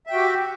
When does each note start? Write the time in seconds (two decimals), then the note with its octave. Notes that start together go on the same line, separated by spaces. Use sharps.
0.07 E5
0.10 G5
0.13 F#4
0.16 G4